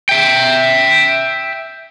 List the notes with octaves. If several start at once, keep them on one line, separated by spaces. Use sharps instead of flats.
E5 G5